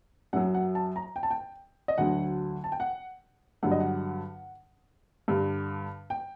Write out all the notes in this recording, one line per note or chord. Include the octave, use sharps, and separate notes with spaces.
F#2 F#3 F#5
F#5
A5
A#5
G5
A5
G5
D#5
D2 D3 F#3 F#5
A5
G5
F#5
G2 D3 F#3 F#5
D#5
F#5
G2 D3 G3
G5